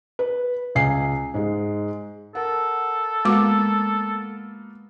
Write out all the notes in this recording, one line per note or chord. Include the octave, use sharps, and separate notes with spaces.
B4
C#2 G#5 C7
G#2 G#3
A4 A#4 F#5
G#3 A#3 B3 F#4 D6